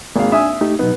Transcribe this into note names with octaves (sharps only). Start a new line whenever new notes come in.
G#1 A#3 F5
D4 E5 G#5 D#6
A3 D#4 G4
B2 F#3 B3 D#4